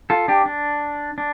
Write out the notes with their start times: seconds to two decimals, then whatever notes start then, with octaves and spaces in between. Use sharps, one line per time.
0.10 F4 A4
0.28 D4 G4
0.46 D4
1.18 D4